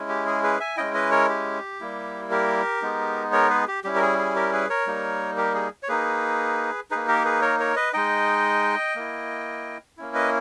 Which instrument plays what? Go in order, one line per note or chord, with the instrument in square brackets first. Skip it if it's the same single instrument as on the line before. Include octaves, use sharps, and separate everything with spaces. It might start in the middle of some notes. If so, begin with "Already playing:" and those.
Already playing: [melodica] G#3 C#4 E4
G4
G#4
G#4 B4
E5 G#5
G#3 C#4 E4 D#5 G5
B4 D#5
A#4 C#5
G4
G3 A#3 E4
G4 A#4
G#3 B3 D#4
A#4 C#5
G#4 B4
G4
G3 C#4 E4 G4
A#4
G#4
G#4
G4 A#4
G#4 B4
A#4 C#5
G3 A#3 D#4
G4 A#4
G#4
C#5
A#3 D#4 G#4 B4
A#3 D#4 G#4 B4
G4 A#4
G#4 B4
A#4 C#5
A#4 C#5
B4 D#5
G#3 D#4 D#5 G5
A#3 E4
A#3 C#4 E4
B4 D#5